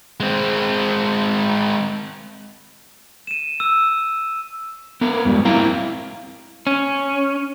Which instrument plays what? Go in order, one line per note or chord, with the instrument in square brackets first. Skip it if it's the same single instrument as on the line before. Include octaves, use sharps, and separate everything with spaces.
[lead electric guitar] G#3 C4
[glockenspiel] D#7 E7
E6
[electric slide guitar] B3 A#4
F2 G3 G#3
C4 E4 A#4 F5 G5 A#5
[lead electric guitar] C#4